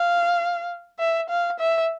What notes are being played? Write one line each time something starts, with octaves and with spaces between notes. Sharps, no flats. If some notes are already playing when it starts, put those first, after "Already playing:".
Already playing: F5
E5
F5
E5